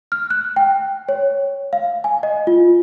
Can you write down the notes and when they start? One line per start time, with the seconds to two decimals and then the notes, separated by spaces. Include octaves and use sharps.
0.12 F6
0.30 F#6
0.56 G5
1.09 C#5
1.73 F5
2.04 G#5
2.23 D#5
2.47 F4